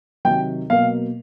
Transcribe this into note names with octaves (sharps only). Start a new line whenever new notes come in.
C3 D#3 F#3 G5
B2 F#3 A#3 F5